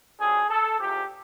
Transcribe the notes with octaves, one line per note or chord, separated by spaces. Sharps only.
F2 D3 F#3 G#4
A4
E2 C3 F3 G4